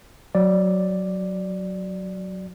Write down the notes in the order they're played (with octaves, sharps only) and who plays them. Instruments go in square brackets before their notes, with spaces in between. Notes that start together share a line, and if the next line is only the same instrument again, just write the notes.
[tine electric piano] F#3 D5